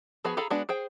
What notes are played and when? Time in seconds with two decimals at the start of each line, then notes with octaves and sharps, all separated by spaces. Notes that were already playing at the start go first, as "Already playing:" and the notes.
0.25 F3 B3 F#4 G#4 B5
0.37 F4 G#4 A4 A#5 B5
0.50 G#3 B3 D4 F#4
0.69 G#4 C5 G5